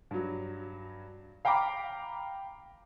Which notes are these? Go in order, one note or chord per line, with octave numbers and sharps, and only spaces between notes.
G2 F#3
F5 G5 A#5 B5 D6